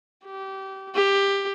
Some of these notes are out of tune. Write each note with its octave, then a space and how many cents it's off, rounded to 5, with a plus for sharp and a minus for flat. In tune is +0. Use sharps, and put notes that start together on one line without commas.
G4 -25
G4 +15